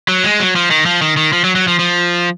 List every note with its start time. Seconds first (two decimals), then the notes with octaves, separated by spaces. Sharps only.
0.08 F#3
0.24 G#3
0.40 F#3
0.56 F3
0.71 D#3
0.86 F3
1.02 D#3
1.17 D#3
1.33 F3
1.44 F#3
1.56 F#3
1.68 F3
1.79 F3